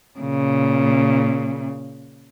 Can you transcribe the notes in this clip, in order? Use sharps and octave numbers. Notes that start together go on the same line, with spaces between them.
A#2 C#3